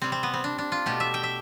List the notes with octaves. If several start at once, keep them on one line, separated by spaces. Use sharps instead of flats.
C3 G3 C4
C4
B3
C4
D4
D4
F4
B2 A3 G4
E5
G5
E5